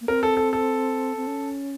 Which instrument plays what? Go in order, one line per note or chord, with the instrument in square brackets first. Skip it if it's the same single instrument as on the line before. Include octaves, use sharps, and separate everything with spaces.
[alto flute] A#3
[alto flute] C4 [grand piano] A#4
[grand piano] A4
A4
A4
[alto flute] C4
C#4